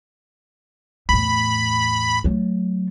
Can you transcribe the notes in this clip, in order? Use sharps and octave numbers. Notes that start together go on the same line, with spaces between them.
E2 A2 B5
F#3 A3